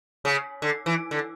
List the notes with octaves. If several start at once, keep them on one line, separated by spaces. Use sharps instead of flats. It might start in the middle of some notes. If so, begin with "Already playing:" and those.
C#3
D3
E3
D3